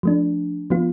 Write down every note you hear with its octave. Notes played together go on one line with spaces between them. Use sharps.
F3 A3 D4
F3 B3 F4